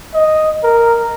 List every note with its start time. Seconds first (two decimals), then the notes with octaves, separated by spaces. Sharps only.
0.14 D#5
0.63 A#4